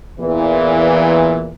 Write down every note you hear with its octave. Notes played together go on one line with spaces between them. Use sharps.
E2 A#2 E3